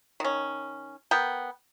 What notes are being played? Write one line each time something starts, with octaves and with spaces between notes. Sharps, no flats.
D#3 C#4
B3 A#4 G5